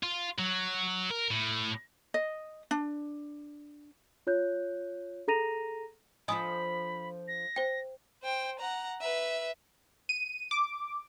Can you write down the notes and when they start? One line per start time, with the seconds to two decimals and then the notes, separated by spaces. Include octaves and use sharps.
0.03 F4
0.39 F#3
1.10 A#4
1.30 A2
2.14 D#5
2.71 D4
4.27 F4 C#5 F#6 G6
5.28 G#4 A4 A#5 A#6 D#7 F7
6.28 F3 D4 A4 D#5 G#5 B5 D#6
7.28 A#6
7.56 C5 G5
8.23 C5 G5
8.59 F#5 A#5
9.01 B4 E5
10.09 D#7
10.51 D6